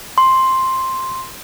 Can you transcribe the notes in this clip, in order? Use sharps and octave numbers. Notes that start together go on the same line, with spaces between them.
C6